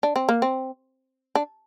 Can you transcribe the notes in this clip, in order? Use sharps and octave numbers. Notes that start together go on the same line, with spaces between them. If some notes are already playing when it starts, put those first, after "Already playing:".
D4
C4
A#3
C4
D4